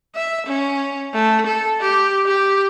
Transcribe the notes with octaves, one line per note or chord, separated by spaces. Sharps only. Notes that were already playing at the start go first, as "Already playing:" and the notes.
E5
C#4
A3
A4
G4
G4